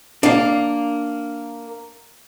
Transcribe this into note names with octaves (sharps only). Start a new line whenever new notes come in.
A#3 D4 F5